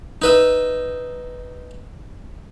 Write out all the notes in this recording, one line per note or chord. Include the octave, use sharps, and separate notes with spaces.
D#4 B4 E5